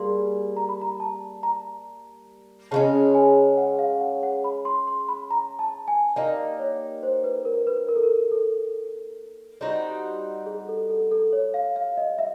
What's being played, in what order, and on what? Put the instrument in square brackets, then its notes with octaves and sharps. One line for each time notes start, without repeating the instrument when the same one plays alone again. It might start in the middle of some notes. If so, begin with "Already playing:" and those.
Already playing: [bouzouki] G3 A#3 G#4 [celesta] C6
[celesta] A#5
B5
A#5
A5
A#5
[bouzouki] C#3 F3 G#3 C#4 [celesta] A5
[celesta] G#5
F#5
F5
F#5
F#5
B5
C6
C6
B5
A#5
A5
G#5
[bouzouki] A#3 D#4 G4 [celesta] D5
[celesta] C#5
C5
B4
A#4
B4
A#4
A4
A#4
A4
[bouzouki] G3 C4 D#4 F#4
[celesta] G#4
A4
A4
A4
C#5
F5
F5
D#5
E5